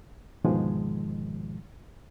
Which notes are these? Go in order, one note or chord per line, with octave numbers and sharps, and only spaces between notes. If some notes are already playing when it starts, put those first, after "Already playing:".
D2 G#2 B2 D#3 F3 G#3